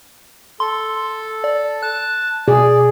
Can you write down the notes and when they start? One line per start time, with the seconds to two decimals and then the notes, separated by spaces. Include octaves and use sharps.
0.60 A4 C6
1.44 D5
1.83 A5 F#6
2.48 B2 G#4 D5